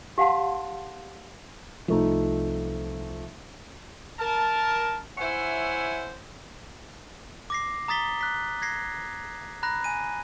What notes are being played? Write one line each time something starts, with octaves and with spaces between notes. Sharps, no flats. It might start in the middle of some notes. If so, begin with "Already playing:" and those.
G4 F5 F#5 A5 C6
C2 F3 A3 D#4
A#4 A5
E4 C5 C#5 E5 F#5 G#5
D6 A#6 C7
A#5 D#6 A6 B6 G7
F#6 B6
G#6 A#6 C7
A#5 B5 F#6 A#6
G#5 D#7